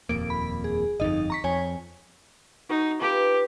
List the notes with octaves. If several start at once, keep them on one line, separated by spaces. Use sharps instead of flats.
D#1 F2 A#3 D7
B5
G#4
G1 F2 D#4 D#5
A#5 C#6 B6
F2 C#5 G#5
D#4 F#4
F4 G4 B4 A5